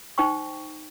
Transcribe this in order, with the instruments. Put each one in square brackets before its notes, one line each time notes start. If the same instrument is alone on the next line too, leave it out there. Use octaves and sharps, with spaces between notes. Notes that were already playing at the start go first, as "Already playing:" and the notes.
[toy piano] D#4 C5 G5 C#6